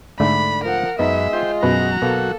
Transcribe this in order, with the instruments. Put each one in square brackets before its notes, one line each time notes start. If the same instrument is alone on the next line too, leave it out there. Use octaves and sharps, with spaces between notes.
[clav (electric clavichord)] G#2 D3 A3 [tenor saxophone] D4 [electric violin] B5
[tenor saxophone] F3 [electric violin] A#4 F#5
[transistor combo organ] F#2 B5 [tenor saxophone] G#3 [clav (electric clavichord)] B3 D#4 [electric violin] E5
[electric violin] F4 [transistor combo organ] C5 G5
[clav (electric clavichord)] F#2 B2 B4 [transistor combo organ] F#3 F#4 [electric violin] A#5
[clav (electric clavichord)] B2 [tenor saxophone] A#3 [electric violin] A4